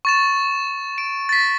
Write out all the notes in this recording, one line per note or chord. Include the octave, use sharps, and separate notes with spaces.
C#6 A6 E7
D7
A6 B6